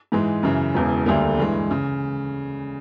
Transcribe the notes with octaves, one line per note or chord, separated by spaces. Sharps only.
G#2 E3 G#3
F#2 C#3 E3
E1 E2 C#3
D2 D3 G3 A#3
G2 E3 G#3
C#3